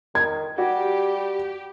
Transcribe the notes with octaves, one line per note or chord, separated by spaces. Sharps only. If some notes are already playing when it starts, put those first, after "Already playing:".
D#3 G#6
G3 F#4 G4